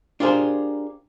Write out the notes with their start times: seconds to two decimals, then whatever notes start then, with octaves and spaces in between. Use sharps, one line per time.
0.20 D4 F4 G4 G#4 A#4 C5